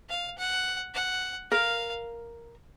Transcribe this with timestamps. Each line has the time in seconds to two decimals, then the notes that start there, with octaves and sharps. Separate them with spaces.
0.09 F5
0.38 F#5
0.94 F#5
1.52 A#4 F5